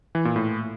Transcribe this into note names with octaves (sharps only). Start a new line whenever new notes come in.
E3
A#2
A2